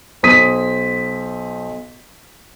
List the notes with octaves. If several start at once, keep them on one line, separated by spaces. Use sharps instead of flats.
B1 C5 D#6 B6 D#7